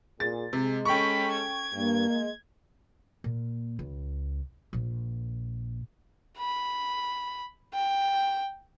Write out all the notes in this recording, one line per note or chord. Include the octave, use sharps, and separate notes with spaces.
A#2 G#4 A6
C3 G#3
C#4 A4 G5 B5 C#6
G#6
G2 A#3
G#3 D#5
A#2
C#2
A#1 A#2
B5
G5